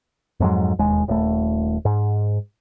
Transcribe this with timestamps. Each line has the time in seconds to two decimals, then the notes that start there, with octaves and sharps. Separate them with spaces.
0.40 F2 G#2 F#3
0.79 E1 D#2 G#3
1.08 D#1 A3
1.85 G#2